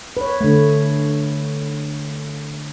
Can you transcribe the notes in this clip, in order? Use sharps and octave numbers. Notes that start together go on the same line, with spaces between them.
B4 C#5
D3 A3